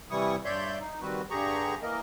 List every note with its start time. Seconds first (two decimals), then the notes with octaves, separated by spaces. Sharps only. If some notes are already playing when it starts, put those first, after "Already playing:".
0.11 C3 E3 G3 E4 C#6 D#6
0.45 G2 C#5 D5 E5 C6 G6
0.80 D#4
1.01 D#3 G3 C4 F#4 B4
1.31 G2 D3 G4 G#4 A#5 C#6
1.83 E3 A#3 A#4 D#5